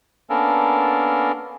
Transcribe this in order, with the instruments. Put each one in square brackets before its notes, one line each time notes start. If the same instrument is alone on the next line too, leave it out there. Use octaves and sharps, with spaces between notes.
[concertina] A#3 B3 C#4 D4 A4 A#4